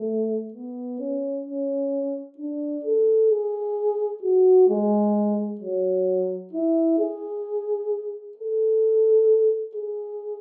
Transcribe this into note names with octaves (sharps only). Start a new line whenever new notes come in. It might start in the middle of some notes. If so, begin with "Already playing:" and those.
Already playing: A3
B3
C#4
C#4
D4
A4
G#4
F#4
G#3
F#3
E4
G#4
A4
G#4